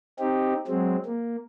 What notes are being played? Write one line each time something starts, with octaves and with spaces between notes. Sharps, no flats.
C4 D#4 G4
F#3 G#3 C4
A#3